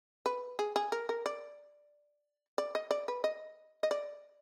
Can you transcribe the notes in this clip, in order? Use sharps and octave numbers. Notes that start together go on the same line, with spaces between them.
B4
G#4
G#4
A#4
A#4
D5
D5
D#5
D5
B4
D#5
D#5
D5